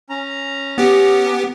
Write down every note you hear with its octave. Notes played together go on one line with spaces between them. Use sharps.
C#4 A#5
B3 G4